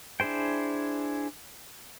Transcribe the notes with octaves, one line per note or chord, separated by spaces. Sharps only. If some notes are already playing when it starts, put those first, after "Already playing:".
D4 E4 G#4 C5 G5